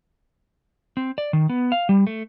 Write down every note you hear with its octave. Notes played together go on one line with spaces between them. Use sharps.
C4
D5
D#3
B3
F5
G3
A3